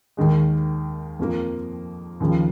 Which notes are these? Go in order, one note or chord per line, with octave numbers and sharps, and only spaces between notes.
D#2 D#3 G#3
F2 F3 A#3
D#2 C#3 F3